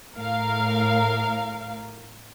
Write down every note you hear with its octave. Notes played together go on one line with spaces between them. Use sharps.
A2 A#4 F5